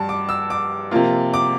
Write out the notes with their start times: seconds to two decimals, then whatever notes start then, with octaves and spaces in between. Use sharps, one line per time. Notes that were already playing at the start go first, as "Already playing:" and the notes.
Already playing: G2 G3 A5
0.09 D6
0.29 E6
0.50 D6
0.91 C3 F3 A#3 F4
1.34 D6